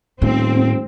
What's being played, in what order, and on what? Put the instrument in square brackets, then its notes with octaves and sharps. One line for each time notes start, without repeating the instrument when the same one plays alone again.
[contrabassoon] D#1 [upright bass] A2 [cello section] C4